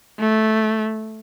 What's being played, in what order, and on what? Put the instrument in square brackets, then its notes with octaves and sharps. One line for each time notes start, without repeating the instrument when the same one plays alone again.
[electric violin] A3